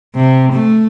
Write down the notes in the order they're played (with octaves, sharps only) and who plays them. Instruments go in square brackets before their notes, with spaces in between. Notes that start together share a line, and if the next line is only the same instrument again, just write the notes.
[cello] C3
A3